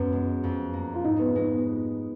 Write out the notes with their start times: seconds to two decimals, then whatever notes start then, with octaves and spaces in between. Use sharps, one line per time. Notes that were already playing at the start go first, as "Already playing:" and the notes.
Already playing: F#2 B3
0.13 G#3
0.44 F2
0.73 A#3
0.94 F4
1.04 G#2 D#4
1.19 B3
1.35 G#3 B3